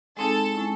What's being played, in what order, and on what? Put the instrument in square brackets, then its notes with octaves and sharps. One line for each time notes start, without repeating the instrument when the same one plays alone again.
[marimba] G#3 C4 D#4 G#4 [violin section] A4
[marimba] G#3 C#4 E4